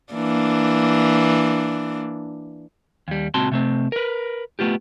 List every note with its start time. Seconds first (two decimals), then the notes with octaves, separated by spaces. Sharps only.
0.13 E3 A#3 D4
3.08 D#2 G3
3.34 C#2 A#2 C4 F#4 A5 C6
3.52 C3 A3 C4
3.92 A#4 B4
4.59 A3 B3 F4 G4